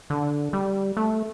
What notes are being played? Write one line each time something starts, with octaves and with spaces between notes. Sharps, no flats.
D3
G3
A3